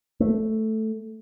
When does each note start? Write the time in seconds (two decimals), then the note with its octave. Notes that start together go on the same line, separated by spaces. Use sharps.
0.20 A3